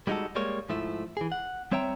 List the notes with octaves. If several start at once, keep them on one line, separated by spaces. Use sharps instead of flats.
G3 G#3 D#4 F4 F#4 A4
G3 G#3 A#3 C#5
G#2 F3 A3 E4
E3 G#4
F#5
G3 C4 C#5 E5 G5 A#5